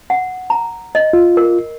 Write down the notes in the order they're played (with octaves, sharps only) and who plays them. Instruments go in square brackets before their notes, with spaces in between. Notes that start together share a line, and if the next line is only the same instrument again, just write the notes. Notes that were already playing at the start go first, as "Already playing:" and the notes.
[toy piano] F#5
A#5
D#5
[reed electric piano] F4
[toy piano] A#4